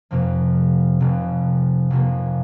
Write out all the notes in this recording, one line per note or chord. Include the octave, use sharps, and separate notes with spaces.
F1 F2 C3 F3 A#3
F1 F2 C3 F3 A#3
F1 F2 C3 F3 A#3